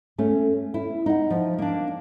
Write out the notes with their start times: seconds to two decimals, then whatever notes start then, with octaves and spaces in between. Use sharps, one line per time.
0.18 A3 C#4
0.74 E4
1.06 D#4 F#5
1.30 F3
1.58 A#3 D4